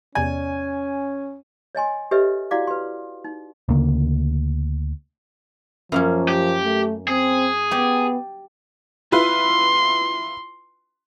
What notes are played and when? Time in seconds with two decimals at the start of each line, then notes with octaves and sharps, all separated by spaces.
0.15 E2 C3 C#4 D5 G#5
1.75 C#5 D#5 G#5 C6
2.11 G4 A4 B4 C#5 D#5 E5
2.51 E4 F#4 D5 F5 D6
2.67 B4 C6
3.25 D#4
3.69 D2 C#3 A#3
5.92 F#2 F3 A#3 C#4
6.28 G4
6.63 A3
7.08 C4 G#4
7.71 B3 G4 D5
9.12 E4 F4 B4 C6